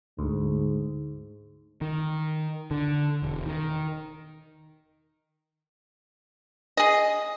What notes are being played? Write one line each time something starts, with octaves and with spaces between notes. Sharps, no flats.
D2 G#2
D#3
D3
E1
D#3
G#4 D#5